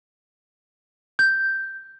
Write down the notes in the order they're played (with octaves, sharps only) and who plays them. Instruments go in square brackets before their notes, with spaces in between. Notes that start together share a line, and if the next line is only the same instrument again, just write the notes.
[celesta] G6